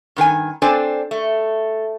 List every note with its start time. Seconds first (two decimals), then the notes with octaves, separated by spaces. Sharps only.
0.16 G2 D#3 G#4 G#5
0.62 C4 D4 A4 C5 D5 G#5
1.11 A3